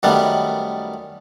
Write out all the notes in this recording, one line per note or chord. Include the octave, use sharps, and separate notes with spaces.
F#2 D#3 G3 A3 B3